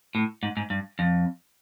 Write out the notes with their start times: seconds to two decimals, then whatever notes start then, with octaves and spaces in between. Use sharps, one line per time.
0.15 A2
0.43 G#2
0.57 G#2
0.70 G2
0.99 F2